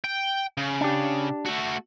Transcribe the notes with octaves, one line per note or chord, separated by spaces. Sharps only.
G5
C#3
D4 G4
A3 F#4